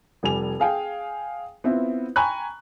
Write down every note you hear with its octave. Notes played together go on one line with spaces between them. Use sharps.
F1 G3 G#5 F7
G#4 F5 G5 G#5
B3 C4 E4 F4
G5 G#5 A#5 B5 C#6 F#6